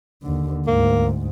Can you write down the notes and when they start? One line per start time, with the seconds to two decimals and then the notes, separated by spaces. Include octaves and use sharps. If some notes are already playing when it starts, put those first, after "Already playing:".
0.22 D#2 D3
0.67 D2 G#2 A#3